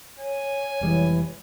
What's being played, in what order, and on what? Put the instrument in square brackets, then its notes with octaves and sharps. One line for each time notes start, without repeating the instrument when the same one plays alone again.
[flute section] C#5 [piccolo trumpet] G#5
[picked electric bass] F1 G3 G#3 [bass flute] E3